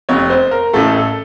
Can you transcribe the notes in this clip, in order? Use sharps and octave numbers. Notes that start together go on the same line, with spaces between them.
F1 F2 C3 C#5
C5
A#4
A1 A2 A3 A4
A4